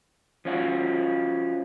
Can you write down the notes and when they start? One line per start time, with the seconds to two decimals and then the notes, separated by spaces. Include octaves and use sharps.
0.45 F3 C#4 F4 F#4